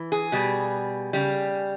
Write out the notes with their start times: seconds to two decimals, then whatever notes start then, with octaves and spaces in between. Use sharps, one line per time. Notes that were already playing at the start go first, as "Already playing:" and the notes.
Already playing: E3
0.12 G#4
0.32 B2 G3
1.13 C#3 G3